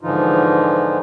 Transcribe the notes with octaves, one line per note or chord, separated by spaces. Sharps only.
G#2 D3 E3 F3 D#4 F4